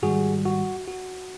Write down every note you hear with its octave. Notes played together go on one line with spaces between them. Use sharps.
G#2 D#3 G3 F#4 G#4
F#4
F#4